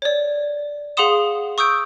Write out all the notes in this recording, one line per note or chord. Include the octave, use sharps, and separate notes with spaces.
C#5 D5
G#4 F5 F#5 C6 D#6 E7
C#6 D#6 E6 G6 D7